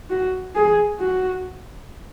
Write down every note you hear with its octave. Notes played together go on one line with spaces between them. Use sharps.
F#4
G#4
F#4